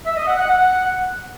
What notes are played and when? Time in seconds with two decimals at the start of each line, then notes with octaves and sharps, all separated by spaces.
0.05 E5
0.16 D#5
0.27 F#5
0.38 F#5
0.49 F#5